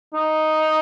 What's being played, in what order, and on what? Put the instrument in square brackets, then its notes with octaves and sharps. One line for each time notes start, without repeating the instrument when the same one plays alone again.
[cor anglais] D#4